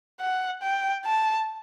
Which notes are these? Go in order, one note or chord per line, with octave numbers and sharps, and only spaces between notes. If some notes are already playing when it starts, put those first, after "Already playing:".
F#5
G5
A5